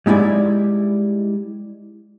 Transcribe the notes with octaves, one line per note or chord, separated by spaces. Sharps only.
G3 G#3 D#4 E4 D5